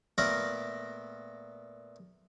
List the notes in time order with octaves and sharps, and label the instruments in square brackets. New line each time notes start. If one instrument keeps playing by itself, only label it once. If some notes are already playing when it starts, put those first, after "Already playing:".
[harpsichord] A#2 A3 B3 A#4 F#5 A#5